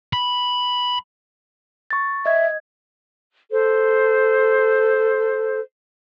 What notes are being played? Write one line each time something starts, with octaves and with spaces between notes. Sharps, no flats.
B5
C#6 A6
D#5 E5 G#6
A4 C5